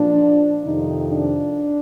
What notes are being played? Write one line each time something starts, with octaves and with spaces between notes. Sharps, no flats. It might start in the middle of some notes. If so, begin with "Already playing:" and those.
Already playing: A#2 F3 D4
F2 C3 D#3 D#4
D4